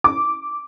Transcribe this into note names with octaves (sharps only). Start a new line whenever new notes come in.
D6